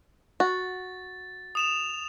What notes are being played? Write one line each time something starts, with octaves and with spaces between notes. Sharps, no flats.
F#4 A6
D#6 E7 F7